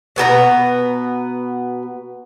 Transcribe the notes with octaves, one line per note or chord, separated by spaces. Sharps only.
B2 B3 A4 A#5